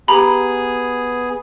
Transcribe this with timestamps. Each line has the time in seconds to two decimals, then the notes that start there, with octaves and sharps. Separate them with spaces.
0.08 B3 G4 G#4 A#5 B5